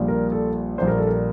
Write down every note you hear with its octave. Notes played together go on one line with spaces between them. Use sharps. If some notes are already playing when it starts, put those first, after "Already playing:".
Already playing: A#1 A#2 G3
A#4
A4
A#1 A#2 G3 C5
A#4
A4
A#4